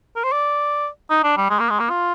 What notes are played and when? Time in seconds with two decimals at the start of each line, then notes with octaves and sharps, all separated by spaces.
0.16 A#4
0.24 C5
0.32 D5
1.10 D#4
1.24 D4
1.37 G3
1.50 G#3
1.60 A#3
1.70 G#3
1.80 A#3
1.90 F4